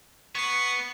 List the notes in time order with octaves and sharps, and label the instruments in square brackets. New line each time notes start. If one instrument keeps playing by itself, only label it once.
[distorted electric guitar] B3 [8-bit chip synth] C#6 C7